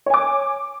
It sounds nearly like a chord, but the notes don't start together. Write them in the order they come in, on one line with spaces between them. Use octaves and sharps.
C#5 G#5 D6